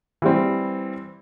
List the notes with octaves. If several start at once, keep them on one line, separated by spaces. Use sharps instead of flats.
E3 G3 C4